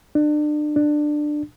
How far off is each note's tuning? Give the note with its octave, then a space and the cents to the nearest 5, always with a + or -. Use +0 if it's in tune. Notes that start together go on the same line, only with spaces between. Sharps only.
D4 +30
D4 +15